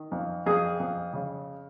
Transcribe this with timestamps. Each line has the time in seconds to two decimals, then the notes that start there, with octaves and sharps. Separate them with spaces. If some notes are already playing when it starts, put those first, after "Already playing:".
Already playing: D#3
0.12 F2
0.46 F2 G#4
0.80 F2
1.13 C#3